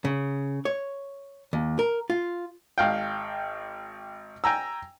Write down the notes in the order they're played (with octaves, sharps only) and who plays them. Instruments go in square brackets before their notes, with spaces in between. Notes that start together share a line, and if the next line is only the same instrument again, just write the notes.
[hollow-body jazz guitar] C#3
C#5
D#2
A#4
F4
[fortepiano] G#1 F5 G5
G5 G#5 A#5 E6